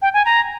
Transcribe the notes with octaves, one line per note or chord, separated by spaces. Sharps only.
G5
G#5
A#5